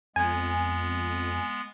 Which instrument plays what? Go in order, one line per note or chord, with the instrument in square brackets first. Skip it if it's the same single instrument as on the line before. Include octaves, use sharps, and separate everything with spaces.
[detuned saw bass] F2 [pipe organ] G#3 B3 [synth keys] G#5